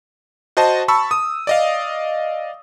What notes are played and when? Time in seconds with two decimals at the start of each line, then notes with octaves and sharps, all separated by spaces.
0.57 F#4 C5 D#5 A5
0.88 A5 B5 C#6 E6
1.11 D#6
1.47 D5 D#5 F5